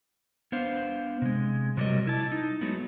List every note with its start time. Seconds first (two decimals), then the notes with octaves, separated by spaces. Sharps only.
0.52 B3 D4 C5 F5
1.22 C3 G#3
1.77 C3 F#3 G3 A4 A#4 D#5
2.07 E4 A5
2.32 D#4
2.61 F#3 G#3 A3 B3